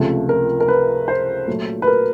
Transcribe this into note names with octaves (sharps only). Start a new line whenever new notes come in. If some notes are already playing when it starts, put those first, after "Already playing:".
Already playing: C#2 C3 F3 A3
A#4
A#4
B4
C5
A#2 F#3 A3
B4
A#4